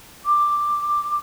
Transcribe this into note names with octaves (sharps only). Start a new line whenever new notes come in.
D6